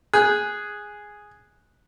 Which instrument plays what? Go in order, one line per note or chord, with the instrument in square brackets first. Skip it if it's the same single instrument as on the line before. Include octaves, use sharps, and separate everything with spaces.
[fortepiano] G#4 [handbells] F#6 G6